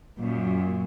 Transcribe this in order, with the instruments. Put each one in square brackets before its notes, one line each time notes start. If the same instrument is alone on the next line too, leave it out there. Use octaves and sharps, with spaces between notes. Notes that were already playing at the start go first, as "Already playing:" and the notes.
[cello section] F#2 A#2